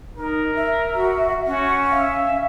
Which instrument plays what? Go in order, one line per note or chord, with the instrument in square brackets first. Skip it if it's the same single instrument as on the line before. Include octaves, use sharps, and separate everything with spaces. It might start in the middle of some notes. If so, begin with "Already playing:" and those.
[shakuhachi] D#4 [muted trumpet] A#4
[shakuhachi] E5
[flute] F#4
[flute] C#4 [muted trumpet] F#4
[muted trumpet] E5 [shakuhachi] F5